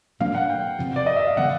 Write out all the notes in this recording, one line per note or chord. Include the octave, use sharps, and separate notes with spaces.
B2 F#3 A#3 D4 F5
F#5
G5
E2 C3 F3
D5
D#5
E5
F5
C#3 E3 G3 B3 F#5